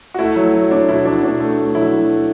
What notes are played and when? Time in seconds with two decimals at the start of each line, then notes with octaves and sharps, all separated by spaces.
0.14 F#4
0.19 A3 E4
0.36 F#3
0.54 F#3
0.71 F#3 D4
0.88 B2 E4
1.05 F#3 D4
1.23 B2 D4
1.40 A3
1.58 A3
1.75 F#3 E4
1.92 F#3
2.10 A3